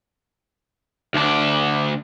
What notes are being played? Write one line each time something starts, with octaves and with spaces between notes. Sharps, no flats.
D2 D4